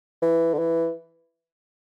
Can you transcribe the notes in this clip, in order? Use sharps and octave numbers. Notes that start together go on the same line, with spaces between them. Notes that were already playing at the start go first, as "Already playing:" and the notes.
E3
D3
E3